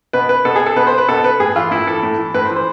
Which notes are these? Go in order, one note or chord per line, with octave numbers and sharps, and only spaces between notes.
B2 B4
B4
B2 A4
G#4
A4
B2 B4
C5
B4
B2 A4
B4
A2 G#4
E3 F4
A2 E4
E3 A4
A2
E3
A2 B4
C5
E3
C5